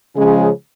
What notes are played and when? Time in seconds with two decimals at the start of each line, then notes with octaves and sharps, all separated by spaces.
0.17 C#3 F3 G#3 C#4 G#4